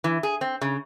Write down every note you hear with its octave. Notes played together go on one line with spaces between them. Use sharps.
E3
G#4
C4
C#3